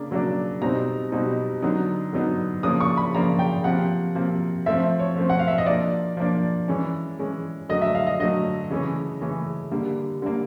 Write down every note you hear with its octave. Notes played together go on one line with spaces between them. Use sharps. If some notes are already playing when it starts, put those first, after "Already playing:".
Already playing: C#3 A#3 D4
C#3 F#3 A#3 D4
B2 G3 C4 D#4 A#5
B2 G3 C4 D#4
D3 F#3 B3 D#4
D3 F#3 B3 D#4
C#3 F3 A#3 D4 D#6
C#6
B5
C#3 F3 A#3 D4 A#5
G5
C3 F3 A#3 F#5
C3 F3 A#3
F3 A3 C4 E5
C#5
F3 A3 C4
F#5
F5
E5
D#5
F3 A#3 D4 D5
F3 A#3 D4
E3 G#3 C#4
E3 G#3 C#4
D3 F#3 A3 D#5
E5
F5
D#5
D3 F#3 A3 D#5
C#3 E3 A3 C#4
C#3 E3 A3 C#4
D3 G3 A#3
D3 G3 A#3